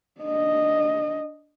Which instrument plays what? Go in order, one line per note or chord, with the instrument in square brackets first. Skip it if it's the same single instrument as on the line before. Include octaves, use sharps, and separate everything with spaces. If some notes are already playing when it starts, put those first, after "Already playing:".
[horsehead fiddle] D4 D#5